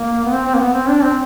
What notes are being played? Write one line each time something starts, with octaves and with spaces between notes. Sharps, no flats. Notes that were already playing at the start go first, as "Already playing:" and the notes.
Already playing: A#3
B3
C4
C4
A#3
B3
C4
D4
C4